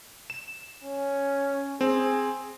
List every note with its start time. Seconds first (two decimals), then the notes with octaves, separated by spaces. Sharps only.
0.30 E7
0.84 C#4
1.81 C4 G#4